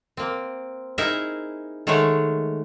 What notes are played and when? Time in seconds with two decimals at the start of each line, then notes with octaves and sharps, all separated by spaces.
0.17 A#3 C4
0.98 D#4 E4 G#4 A#4 E5
1.87 D#3 G#3 A3 G#4 C#5 F#5